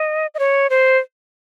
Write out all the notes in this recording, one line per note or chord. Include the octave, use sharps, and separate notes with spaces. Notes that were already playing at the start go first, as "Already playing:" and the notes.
Already playing: D#5
D#5
C#5
C5